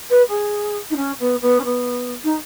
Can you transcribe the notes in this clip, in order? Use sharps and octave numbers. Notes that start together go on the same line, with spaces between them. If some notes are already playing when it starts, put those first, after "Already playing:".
B4
G#4
D#4
C#4
B3
B3
C#4
B3
D#4